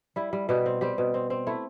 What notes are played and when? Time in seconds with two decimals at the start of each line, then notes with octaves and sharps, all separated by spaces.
0.16 G3 E4
0.33 G3
0.49 B2 G3 G4
0.66 C4
0.81 G3 C4 G4
0.98 B2
1.14 C4
1.30 C4
1.47 A3 E4